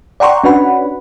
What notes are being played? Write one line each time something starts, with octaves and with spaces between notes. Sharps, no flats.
D5 F#5 G5 A#5 C6 C#6
C#4 D4 F#4 B4 F#5 B5